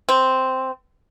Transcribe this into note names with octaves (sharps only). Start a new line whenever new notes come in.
C4